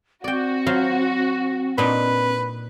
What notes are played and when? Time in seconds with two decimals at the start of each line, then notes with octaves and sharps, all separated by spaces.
0.24 C4 F#4 D5 G5
0.66 F#3 F4 C5
1.78 A#2 D4 D#4 B4